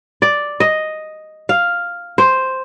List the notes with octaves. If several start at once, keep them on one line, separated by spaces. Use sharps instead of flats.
D5
D#5
F5
C5